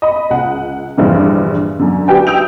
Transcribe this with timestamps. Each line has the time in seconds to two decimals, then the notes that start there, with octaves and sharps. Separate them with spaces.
0.02 D#5 B5
0.30 C#2 F#5
0.98 A#1 E2 G2 D3
1.79 F#2 D3
2.08 D4 F#4 G4 B4 G5 G#5
2.27 G5 D#6 E6 G6 D7 F7